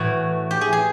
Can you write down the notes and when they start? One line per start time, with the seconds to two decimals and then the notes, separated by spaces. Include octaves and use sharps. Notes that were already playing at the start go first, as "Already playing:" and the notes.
Already playing: A2 E3 F#4
0.51 G4
0.61 G#4
0.73 G#4